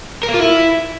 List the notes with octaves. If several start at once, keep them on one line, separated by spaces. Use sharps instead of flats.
A#4
A#3
F4
E4